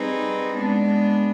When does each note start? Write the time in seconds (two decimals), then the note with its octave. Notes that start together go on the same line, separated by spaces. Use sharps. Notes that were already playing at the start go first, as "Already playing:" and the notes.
Already playing: G3 C4 D#4 G#4 B4
0.56 G#3 B3 D4